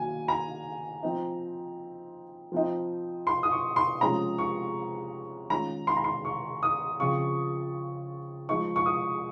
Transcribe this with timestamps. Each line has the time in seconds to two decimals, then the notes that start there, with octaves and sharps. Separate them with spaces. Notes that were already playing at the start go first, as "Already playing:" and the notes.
Already playing: D#3 F#3 A#3 G#5
0.28 A#5
1.03 F3 C4 D#4
2.52 F3 C4 D#4
3.27 C6
3.43 D#6
3.52 C#6
3.76 C6
4.01 C3 F3 G#3 C#4 F4 A#5
4.38 C#6
5.50 D#3 G#3 C#4 F4 A#5
5.87 C6
5.97 A#5
6.04 C6
6.25 C#6
6.63 D#6
6.99 C#3 F3 C4 F4 C#6
8.49 F3 G#3 D#4 C#6
8.76 C#6
8.86 D#6